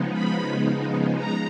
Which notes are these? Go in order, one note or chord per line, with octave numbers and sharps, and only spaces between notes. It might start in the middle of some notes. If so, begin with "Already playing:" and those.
Already playing: C#3 F3 G#3 B3 D#4
B5
A#5